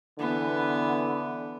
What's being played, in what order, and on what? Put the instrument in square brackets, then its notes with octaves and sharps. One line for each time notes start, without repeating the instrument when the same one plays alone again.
[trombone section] D3 E3 D4 [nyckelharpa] B3